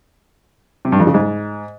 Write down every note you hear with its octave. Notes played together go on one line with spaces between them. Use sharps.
C3
G2
F2
C#3
G#2